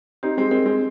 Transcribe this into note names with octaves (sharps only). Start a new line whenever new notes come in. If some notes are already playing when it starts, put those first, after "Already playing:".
C4 D#4 G4
G#3 C4
G#3 C4 A#4
G#3 C4